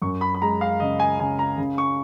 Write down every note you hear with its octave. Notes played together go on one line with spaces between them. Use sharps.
F#2 C#6
B5
B5
G#3 A#5
F5
C#3 D#5
G#5
C#3 G#5
A#5
C#3
C#6